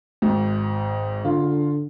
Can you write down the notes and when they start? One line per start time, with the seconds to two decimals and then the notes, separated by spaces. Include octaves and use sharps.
0.22 G#1 G#2
1.25 D3 F4